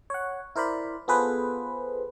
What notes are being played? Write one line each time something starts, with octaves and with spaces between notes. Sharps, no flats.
C#5 F#5
E4 A#4 C5 D5 B5
B3 F4 G#4 A4 B4 C5